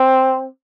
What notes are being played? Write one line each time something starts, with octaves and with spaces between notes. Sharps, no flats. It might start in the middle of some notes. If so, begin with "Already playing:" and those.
Already playing: C4